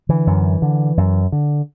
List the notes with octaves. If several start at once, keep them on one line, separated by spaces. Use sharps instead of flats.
D3 E3
F#2
D3
F#2
D3